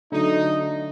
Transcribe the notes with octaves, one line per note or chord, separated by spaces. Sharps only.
D3 F#3 A3 D#4